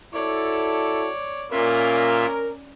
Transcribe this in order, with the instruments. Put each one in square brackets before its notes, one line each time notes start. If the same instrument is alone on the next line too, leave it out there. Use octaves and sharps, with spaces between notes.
[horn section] E4 F#4 A4 [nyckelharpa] C#5 D5
[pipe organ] A#2 F4 E5 [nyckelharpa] C#4 D5 [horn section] A#4